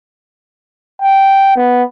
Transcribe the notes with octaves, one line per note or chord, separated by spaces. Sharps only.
G5
B3